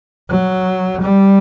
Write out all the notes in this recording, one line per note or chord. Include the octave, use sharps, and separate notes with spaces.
F#3
G3